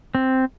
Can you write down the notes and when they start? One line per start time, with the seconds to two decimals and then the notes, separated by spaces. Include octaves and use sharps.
0.15 C4